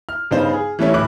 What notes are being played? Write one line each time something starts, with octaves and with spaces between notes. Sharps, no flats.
F6
G2 C#3 B3 D#4 C5 F5
G#4
E3 G3 A3 C#4 E4
D1 E4 D6 F#6